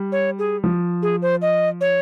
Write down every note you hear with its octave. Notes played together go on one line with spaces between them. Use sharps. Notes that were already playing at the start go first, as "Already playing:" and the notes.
Already playing: G3
C#5
G#4
F3
G#4
C5
D#5
C#5